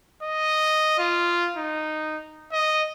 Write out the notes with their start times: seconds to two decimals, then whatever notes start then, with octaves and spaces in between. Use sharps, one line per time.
0.23 D#5
0.99 F4
1.56 D#4
2.53 D#5